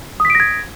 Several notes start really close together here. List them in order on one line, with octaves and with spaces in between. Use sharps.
D#6 B6 D7 A#6 G#6